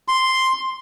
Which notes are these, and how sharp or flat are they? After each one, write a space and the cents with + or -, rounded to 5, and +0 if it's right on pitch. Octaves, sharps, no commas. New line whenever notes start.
C6 +0